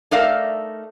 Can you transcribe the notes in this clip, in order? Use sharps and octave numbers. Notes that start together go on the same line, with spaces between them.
A3 D#4 A#4 D5 E5 F5